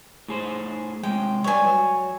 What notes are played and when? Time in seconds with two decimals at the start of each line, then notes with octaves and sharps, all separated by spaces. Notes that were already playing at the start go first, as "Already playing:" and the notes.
0.28 A2 G#4 C5
1.03 C3 G#3 G5
1.44 G3 B4 C#5 D5 G#5
1.65 F#3